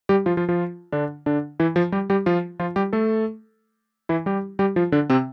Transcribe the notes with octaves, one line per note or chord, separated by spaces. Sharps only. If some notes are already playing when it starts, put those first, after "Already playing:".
G3 G4
F3 F4
F3 F4
F3 F4
D3 D4
D3 D4
E3 E4
F3 F4
G3 G4
G3 G4
F3 F4
F3 F4
G3 G4
A3 A4
E3 E4
G3 G4
G3 G4
F3 F4
D3 D4
C3 C4